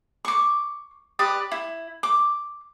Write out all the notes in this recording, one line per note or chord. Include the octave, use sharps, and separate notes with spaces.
C#6 D6
G4 B4 D5 D#6
E4
D6